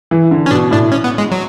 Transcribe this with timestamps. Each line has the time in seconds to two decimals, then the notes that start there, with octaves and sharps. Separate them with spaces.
0.11 E3
0.31 D3
0.46 C#4
0.51 B2 D4
0.71 A2 D4
0.92 C#4
1.04 B3
1.18 G#3
1.31 F#3